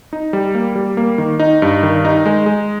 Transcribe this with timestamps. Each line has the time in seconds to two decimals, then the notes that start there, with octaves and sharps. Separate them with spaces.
0.13 D#4
0.33 G3
0.55 A#3
0.75 G3
0.97 A#3
1.18 D#3
1.39 D#4
1.62 G2
1.83 D#3
2.05 D#4
2.26 G#3
2.46 G#3